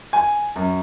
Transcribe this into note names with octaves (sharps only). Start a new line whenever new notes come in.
G#5
F#2